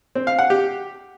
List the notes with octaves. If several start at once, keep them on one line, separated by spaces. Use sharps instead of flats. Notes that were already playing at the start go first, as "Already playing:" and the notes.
C4
F5
F#5
G4